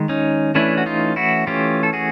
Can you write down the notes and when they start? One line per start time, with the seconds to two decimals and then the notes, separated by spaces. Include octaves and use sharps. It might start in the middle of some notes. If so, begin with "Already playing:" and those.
Already playing: D#3 G#3
0.09 C#4 D#4
0.55 E3 A3 C#4 D4 E4
0.77 F#4
0.86 D#4 F4
1.16 E4 F#4
1.47 E3 A3 C#4 F4 G4
1.83 A4
1.93 F#4 G#4